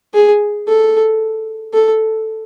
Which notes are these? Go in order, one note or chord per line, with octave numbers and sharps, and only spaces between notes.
G#4
A4
A4